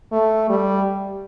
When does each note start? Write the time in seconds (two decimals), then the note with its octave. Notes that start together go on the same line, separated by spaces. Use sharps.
0.12 A3
0.49 G3